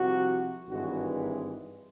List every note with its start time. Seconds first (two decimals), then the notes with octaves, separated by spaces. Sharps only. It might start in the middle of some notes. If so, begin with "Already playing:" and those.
Already playing: C2 C3 F3 F#4
0.69 G#1 G2 E3 G#3 F#4